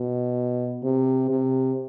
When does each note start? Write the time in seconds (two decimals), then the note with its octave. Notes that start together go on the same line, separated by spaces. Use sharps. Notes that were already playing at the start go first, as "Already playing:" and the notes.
Already playing: B2
0.83 C3
1.30 C3